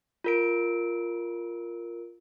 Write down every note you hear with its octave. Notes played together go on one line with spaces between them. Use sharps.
F4 A#4 D7